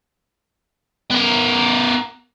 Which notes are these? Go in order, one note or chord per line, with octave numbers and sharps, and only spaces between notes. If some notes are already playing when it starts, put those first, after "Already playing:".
B3 A#4